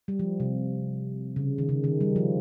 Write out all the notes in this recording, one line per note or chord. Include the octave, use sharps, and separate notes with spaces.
G3
F3
C3
C#3
D#3
C#3
D#3
G3
F3